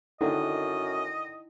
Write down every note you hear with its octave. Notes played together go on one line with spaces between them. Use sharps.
F#2 D3 D#3 D#4 E4 D#5